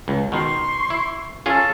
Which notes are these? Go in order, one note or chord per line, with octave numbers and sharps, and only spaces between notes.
C#2
B2 D#3 C6 C#6
E4
C#4 F4 G#4 A4